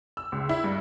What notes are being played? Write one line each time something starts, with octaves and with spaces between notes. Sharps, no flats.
E6
C#2
E4
G2